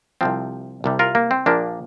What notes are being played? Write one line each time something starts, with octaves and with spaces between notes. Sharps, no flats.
C2 C3 F3 C4
C2 C3 G3
F4 A#4
A#3
C4
A#1 A#2 F3 A#3 D4